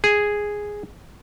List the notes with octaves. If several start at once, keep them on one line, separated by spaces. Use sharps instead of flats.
G#4